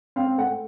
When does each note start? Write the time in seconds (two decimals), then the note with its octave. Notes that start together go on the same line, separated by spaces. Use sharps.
0.16 C4 F5
0.38 A3 F#5